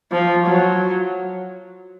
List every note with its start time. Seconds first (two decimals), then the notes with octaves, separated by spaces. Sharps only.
0.12 F3
0.45 F#3